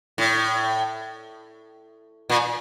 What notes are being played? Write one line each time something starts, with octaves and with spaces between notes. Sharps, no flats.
A2
A#2